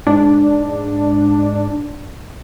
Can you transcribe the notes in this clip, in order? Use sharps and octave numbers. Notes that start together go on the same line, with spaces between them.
G#2 D4